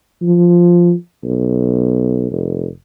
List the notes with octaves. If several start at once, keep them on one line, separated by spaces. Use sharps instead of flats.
F3
B1
F1